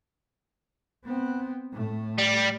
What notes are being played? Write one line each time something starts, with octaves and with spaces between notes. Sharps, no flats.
B3 C4
A2 A3
G3